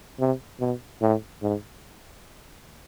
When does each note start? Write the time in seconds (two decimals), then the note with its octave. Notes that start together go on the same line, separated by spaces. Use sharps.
0.20 C3
0.60 B2
1.01 A2
1.42 G#2